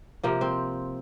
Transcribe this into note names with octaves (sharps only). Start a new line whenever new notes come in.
C3 F3 A#3
C4